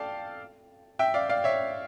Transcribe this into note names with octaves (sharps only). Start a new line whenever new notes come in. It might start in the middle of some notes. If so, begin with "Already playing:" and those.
Already playing: A4 D5 F5 G5
E5 G5
D5 F5
D5 F5
C#5 E5